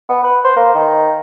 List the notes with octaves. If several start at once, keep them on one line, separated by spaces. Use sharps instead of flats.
B3
B4
C5
A#3
D#3